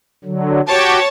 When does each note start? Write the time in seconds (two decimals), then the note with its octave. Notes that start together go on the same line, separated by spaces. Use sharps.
0.24 D3 F#3
0.68 F#4 G4 C#5 G5 A5